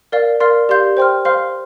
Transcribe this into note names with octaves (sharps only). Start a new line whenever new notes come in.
A#4 D5 F5
A#4 D5 F5 C6 F6
G4 D5 F5 C6 G6
C5 G5 C6 F6
C5 F5 C6 F6